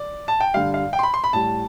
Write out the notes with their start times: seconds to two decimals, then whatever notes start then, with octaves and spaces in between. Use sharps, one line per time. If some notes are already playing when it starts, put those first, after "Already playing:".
Already playing: D5
0.28 A5
0.40 G5
0.54 G2 D3 G3 F5
0.74 F5
0.93 G5
0.99 C6
1.03 B5
1.14 C6
1.24 B5
1.33 A2 G3 A5